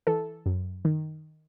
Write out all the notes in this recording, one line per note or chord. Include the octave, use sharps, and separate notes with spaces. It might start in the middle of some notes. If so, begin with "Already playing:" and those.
E3 A4
F#2
D#3